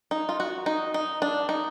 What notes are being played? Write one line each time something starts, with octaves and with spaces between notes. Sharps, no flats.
D#4
F4
F#4
D#4
D#4
D4
D#4